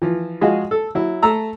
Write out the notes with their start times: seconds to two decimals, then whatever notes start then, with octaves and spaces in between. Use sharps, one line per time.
0.02 E3 F3
0.41 F3 G#3 F#4 G#4 D#5 F5
0.71 A4
0.95 F#3 E4
1.22 A3 A4 A#5 E6